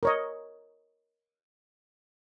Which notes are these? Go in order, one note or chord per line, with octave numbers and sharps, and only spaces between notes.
A#4 C#5 D#5